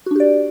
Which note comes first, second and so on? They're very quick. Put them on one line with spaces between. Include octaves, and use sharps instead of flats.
F#4 D4 G4 D5